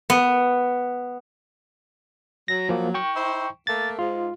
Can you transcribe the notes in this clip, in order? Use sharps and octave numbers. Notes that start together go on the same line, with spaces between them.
B3
F#3 A#6
F3 A#3
G5 C#6
D#4 E4 C5
A3 A#3 A6
G#2 F4